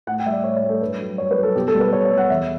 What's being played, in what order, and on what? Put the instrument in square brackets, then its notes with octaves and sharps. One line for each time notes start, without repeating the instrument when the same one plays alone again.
[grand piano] A2 F#5
G5
G3 E5
D5
A2 C#5
C#5
G3
A4
G2 B4
F#3
G2 C#5
B4
F#3
A4
B2 G4
A4
G3
B4
B2 C#5
C#5
G3
F#5
E2 E5